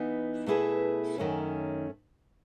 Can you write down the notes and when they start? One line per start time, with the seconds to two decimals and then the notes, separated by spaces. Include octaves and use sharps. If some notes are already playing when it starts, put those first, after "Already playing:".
Already playing: E3 B3 D#4
0.46 B2 A3 E4 G#4 B4
1.18 F#2 D#3 A3 C#4